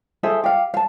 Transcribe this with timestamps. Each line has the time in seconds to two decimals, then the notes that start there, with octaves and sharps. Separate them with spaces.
0.23 G#4 A4 C5 E5
0.44 G4 F5
0.74 F5 A5